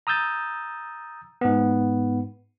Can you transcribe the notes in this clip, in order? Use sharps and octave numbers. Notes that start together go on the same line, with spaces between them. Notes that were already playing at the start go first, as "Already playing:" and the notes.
A#5 D#6 E6 G6 A6
G#2 B3